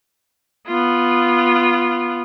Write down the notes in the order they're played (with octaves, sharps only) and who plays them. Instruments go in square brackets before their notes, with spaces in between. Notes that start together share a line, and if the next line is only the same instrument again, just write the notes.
[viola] B3 F4